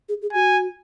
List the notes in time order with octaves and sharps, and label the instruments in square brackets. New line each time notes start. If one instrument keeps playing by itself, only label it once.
[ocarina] G#4
G#4
[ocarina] F#4 [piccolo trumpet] G#5